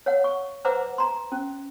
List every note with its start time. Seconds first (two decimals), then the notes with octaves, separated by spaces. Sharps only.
0.06 C#5 F5 F#5
0.24 C#6
0.65 B4 C5 E5 F#5 A#5 D6
0.98 A#5 C6
1.32 C#4